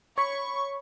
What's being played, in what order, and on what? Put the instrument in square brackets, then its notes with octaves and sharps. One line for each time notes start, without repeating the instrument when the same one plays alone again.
[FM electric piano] C#5 B5 [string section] C#6